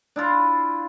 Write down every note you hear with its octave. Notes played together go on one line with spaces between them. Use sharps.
D4 E4 F4